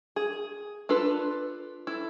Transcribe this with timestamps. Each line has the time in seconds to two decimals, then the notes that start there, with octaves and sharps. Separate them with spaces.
0.16 G#4
0.89 D4 F4 A4 B4
1.87 E4 A4